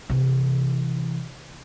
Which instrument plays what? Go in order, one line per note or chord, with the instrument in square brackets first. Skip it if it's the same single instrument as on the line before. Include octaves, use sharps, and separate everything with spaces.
[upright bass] C3 E3